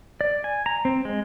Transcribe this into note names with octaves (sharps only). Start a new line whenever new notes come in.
D5
G#5
A#5
C4
G#3